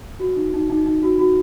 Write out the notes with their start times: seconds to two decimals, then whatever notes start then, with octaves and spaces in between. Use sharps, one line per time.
0.20 F#4
0.36 D#4
0.54 D#4
0.70 D#4
0.86 D#4
1.03 F#4
1.19 F#4